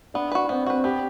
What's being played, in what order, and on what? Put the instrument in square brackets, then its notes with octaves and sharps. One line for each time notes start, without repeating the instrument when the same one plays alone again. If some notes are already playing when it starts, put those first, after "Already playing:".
[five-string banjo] B3 [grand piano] D4
[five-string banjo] F#4 B4
[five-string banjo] B3 [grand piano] C4
[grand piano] C4 [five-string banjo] F#4 B4
[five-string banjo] B3 [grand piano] G4